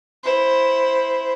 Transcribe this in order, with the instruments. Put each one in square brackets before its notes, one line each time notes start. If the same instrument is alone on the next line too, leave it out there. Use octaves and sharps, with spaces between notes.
[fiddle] E4 C5